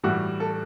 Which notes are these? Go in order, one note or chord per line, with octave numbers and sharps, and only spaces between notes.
A2 E3 G3 F#4
A4